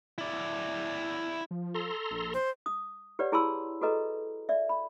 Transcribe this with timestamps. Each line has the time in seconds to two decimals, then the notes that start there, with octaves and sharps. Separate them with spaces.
0.18 E4 D5
1.51 F3
1.74 A4 A#5 C6
2.11 A#1
2.34 C5
2.66 D#6
3.19 G4 B4 C#5 D5 F#5
3.32 E4 G#4 A5 B5 C6 E6
3.81 F#4 G#4 A4 B4 D#5 A#5
4.49 D5 E5
4.69 B5